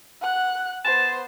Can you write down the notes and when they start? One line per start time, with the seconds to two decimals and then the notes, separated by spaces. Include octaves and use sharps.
0.21 F#5 F#6
0.85 B3 C5 A5